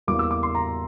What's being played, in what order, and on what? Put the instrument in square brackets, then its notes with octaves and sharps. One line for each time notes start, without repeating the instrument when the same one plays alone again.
[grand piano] E2 E3 G3 A#3 D6
E6
D6
C6
A#5